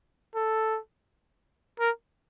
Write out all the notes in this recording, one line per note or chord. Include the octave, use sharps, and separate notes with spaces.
A4
A#4